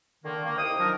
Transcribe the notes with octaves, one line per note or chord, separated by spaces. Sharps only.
D3 D#3 A#3
A#3
C2 D#3 C5 G5 D#6
D#3 F3 F#3 D4 A#4